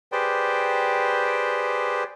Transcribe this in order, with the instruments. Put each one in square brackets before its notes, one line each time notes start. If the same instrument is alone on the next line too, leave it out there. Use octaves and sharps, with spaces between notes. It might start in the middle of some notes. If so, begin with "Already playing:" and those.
[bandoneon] G4 G#4 B4 C5 D5 G5